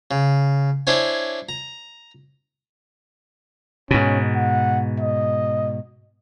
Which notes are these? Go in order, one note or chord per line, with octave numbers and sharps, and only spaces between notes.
C#3
D4 E4 C5 C#5 G#5
A#5
G#2 B2 C#4
F#5
D#5